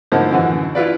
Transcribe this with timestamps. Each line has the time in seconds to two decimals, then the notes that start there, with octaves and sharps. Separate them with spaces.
0.12 A2 D3 F3 A#3 D#4
0.31 F#2 D3 E3
0.75 E4 F4 B4 D5